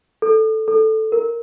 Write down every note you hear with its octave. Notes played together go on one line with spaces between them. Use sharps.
A4
A4
A#4